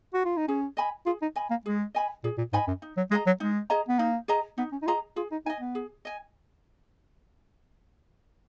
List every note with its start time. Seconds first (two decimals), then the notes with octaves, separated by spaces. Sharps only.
0.14 F#4
0.25 F4
0.37 D#4
0.48 C#4 G#4
0.77 D#5 G#5 B5
1.06 F4 G#4
1.22 D#4
1.36 D#5 G#5 B5
1.50 A#3
1.66 G#3 G#4
1.95 D#5 G#5 B5
2.24 A#2 G#4
2.38 A#2
2.53 G#2 D#5 G#5 B5
2.68 F#2
2.82 D#4
2.97 F#3
3.11 G#3 G#4 D#5 A#5
3.26 F#3
3.40 G#3 D#4
3.70 G#4 D#5 A#5
3.89 B3
3.99 A#3 D#4
4.28 G#4 D#5 A#5
4.58 B3 D#4
4.72 C#4
4.82 D#4
4.87 F4 G#4 D#5 A#5
5.16 F4 G#4
5.32 D#4
5.46 D#4 D#5 G#5
5.60 B3
5.75 G#4
6.05 D#5 G#5